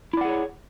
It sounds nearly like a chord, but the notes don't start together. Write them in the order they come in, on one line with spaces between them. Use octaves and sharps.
E4 D5 F#5 G#4 C#5